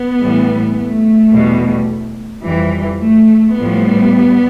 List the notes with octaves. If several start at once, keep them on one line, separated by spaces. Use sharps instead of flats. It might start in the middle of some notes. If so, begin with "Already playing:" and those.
Already playing: B3
A2 E3 G3
A3
E2 B2 G3
F2 E3 G3
A3
A2 F3 G3 B3